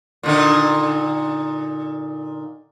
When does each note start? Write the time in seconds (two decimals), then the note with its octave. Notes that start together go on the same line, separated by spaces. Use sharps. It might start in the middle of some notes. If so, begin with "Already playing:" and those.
0.23 A#2 D3 D#4